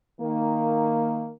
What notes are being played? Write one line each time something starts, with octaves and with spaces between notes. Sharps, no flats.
D#3 A#3